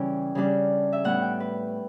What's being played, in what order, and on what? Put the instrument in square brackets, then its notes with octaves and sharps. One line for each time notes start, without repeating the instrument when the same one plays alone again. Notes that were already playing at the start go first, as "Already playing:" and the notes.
Already playing: [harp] C#3 E3 G3 C#4 E4 G5
C#3 G3 D4
E5
A2 G3 B3 E4 F#5
G5
B4